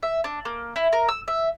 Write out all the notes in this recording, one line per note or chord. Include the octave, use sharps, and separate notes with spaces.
E5
D4
A#3
E4
A#4
E6
E5